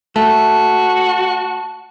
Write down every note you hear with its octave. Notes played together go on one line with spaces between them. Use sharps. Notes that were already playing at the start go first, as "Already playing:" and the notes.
A3 F#4 A5